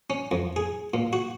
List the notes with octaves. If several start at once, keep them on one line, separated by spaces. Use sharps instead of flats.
C#4
F2
G#4
A#2
F#4